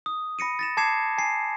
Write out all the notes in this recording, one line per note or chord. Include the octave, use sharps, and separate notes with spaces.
D#6
B5 A#6 C#7 D#7
A6 A#6 E7
A5 D6 G#6 C7 C#7 E7
G#5 C7